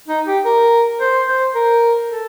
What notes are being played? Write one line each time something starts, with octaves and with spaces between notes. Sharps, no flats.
D#4
G4
A#4
C5
C5
A#4
A4